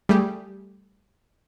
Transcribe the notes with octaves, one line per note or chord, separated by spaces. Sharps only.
G3 A3 G4 G#4